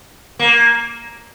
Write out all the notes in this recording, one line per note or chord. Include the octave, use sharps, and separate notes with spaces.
A#3